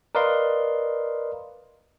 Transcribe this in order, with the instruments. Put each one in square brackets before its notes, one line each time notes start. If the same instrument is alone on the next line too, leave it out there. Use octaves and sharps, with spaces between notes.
[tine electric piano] A#4 B4 D5 D#5 F5 C6